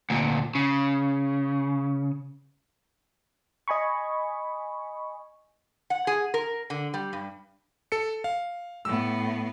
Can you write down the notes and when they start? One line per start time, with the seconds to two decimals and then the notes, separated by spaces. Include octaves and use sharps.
0.10 D2 A#2
0.55 C#3
3.68 D#5 G#5 B5 C#6
5.90 F#5
6.07 G#4
6.34 A#4
6.70 D3
6.94 G3
7.13 G2
7.92 A4 C#7
8.24 F5
8.85 A2 B3 E6